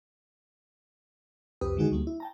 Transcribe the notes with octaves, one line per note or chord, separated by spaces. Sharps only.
C2 F2 C4 G4 B4 D#6
D3 D#3 G#3 D#4 F#4 G#4
D2 G3 A#3
E4
G5 A5 A#5